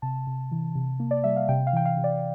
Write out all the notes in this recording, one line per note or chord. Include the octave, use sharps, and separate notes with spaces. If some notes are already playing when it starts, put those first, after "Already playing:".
C3 A5
C3
E3
C3
A#3
D5
G3 E5
F5
C3 G5
F5
E3 G5
F5
C3
D5